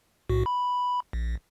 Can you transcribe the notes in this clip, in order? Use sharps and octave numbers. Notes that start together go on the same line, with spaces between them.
B1 A2 F#4
B5
A#1